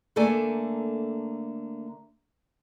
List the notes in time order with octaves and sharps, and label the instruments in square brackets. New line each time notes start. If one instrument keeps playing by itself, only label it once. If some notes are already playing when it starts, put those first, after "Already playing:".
[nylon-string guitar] D3 A3 A#3 A4 D5 G#5